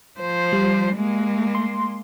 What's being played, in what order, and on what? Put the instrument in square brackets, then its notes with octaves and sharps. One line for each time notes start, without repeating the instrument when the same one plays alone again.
[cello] F3 C5
[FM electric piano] G3
[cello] G#3 A#3
[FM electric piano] C6